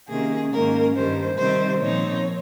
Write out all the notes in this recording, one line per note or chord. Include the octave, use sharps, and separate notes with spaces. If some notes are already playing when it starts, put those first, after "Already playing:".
C3 D#3 A#3 C#4 G#4
G#2 D#3 A#3 C#4 A#4
G2 D#3 G3 C5
C3 D#3 G3 C4 C5
A#2 F3 C4 D#4 C#5